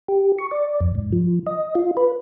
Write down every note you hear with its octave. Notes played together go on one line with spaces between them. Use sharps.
G4
C#6
D5
F2
G#2
F3
D#5
F4
B4